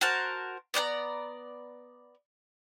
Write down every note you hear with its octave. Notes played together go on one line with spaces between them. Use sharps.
F#4 A#4 C5 A5
B3 D5 F#5 A#5